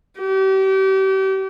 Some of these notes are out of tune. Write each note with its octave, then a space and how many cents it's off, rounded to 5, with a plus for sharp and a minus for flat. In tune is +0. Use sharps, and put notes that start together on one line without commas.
G4 -35